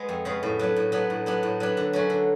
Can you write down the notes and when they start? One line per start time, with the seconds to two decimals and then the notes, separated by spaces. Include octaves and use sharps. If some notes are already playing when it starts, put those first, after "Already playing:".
Already playing: G#3 B3
0.09 F2
0.25 C#3 G#3 B3
0.43 A2
0.59 F#3 B3 D4
0.76 A2
0.92 F#3 B3 D4
1.10 A2
1.26 F#3 B3 D4
1.43 A2
1.60 F#3 B3 D4
1.77 D3
1.93 F#3 A3 C#4
2.10 D3